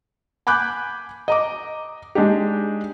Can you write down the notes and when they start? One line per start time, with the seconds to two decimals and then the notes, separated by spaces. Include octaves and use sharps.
0.47 G#5 B5 D6 F#6 G6
1.28 D#5 A#5 D6
2.15 G#3 D4 D#4 G4